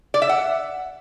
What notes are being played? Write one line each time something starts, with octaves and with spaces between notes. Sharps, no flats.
D5
E5
F#5